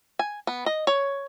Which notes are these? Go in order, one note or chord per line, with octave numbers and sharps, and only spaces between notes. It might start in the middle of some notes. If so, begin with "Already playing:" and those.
G#5
B3
D#5
C#5